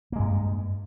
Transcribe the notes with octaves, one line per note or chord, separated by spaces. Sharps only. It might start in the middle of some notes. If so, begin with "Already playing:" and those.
G2 G#3 A#3